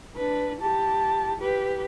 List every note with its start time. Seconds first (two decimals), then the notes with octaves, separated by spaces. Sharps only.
0.16 D4 B4
0.61 G4 A5
1.40 G4 B4